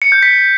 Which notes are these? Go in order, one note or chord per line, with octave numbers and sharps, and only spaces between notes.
C#7
G6
B6